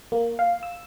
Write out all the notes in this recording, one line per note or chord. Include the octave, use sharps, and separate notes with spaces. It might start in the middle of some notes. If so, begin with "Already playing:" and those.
A#3
F5
E6